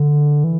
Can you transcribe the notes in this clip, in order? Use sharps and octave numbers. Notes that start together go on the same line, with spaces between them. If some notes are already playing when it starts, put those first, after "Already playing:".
Already playing: D3
E3